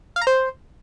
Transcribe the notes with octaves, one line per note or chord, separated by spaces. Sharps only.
F5
A#5
C5